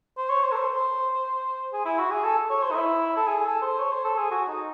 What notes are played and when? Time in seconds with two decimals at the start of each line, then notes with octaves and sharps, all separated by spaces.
0.17 C5
0.30 C#5
0.43 C5
0.52 A4
0.56 C5
0.69 C5
1.73 G#4
1.85 E4
1.99 F#4
2.11 G#4
2.24 A4
2.50 C#5
2.63 C5
2.71 D#4
2.76 E4
3.16 A4
3.27 G#4
3.45 A4
3.62 C5
3.79 C#5
3.92 C5
4.05 A4
4.18 G#4
4.31 F#4
4.48 D#4